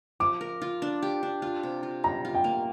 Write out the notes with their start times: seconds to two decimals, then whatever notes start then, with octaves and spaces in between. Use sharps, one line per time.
0.20 F3 D6
0.41 A#4
0.62 F4
0.82 D4
1.02 G4
1.23 D4
1.42 F4
1.63 C3
1.83 F4
2.04 G3 A#5
2.25 F4
2.35 G5
2.44 A#3